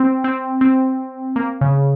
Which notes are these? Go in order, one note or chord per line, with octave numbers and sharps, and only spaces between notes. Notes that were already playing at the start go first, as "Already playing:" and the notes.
Already playing: C4
C4
C4
A#3
C#3